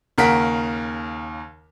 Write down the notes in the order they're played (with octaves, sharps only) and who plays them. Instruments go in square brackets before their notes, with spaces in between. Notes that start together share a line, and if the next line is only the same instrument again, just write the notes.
[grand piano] D#2 C#3 A#4 F#5 A#5 B6